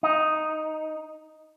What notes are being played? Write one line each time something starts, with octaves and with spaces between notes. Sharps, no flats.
D#4